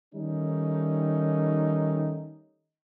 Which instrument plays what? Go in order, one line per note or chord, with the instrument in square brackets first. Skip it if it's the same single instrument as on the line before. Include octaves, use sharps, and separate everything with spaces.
[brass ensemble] D#3 G3 A3 C#4 D#4